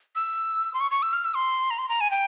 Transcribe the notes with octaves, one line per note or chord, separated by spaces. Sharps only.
E6
C6
C#6
C#6
E6
F6
E6
C6
A#5
C6
A#5
G#5
G5